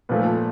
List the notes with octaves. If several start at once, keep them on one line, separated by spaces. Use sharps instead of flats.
A#2 F3 A3 B4